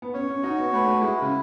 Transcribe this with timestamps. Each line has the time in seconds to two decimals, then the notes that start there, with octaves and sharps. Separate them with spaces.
0.02 B3
0.14 C#4 C#5
0.29 C#4
0.43 D#4 F#4
0.58 B3
0.73 A3 B4
0.87 A3
1.02 G#3 E4
1.21 C#3